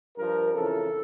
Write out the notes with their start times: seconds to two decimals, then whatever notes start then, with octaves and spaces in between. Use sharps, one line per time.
0.17 G2 F3 A#4
0.54 F2 C#3 E3 A4